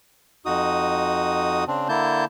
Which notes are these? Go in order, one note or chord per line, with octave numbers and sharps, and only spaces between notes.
F2 D#4 F#4 D#6
C#3 C4 D4
D3 A#3 E4 A5 G6